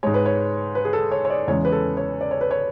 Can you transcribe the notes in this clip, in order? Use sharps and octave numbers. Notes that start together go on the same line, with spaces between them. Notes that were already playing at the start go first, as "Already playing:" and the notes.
G#2 G#3 C#5
B4
C#5
B4
G#4
A4
C#5
C#5
D5
E2 C#3 G#3 C#5
B4
A4
C#5
D5
C#5
B4
C#5